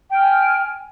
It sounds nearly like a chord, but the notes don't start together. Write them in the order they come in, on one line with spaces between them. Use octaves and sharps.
G5 F6 G#5